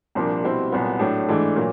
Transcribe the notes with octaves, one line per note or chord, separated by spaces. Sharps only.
C2 A#2 F3 A#3 D4
B2 G3 C4 E4
C2 A#2 F#3 B3
A2 F#3 A3 D4
G#2 E3 A3 D4
A#2 F#3 A#3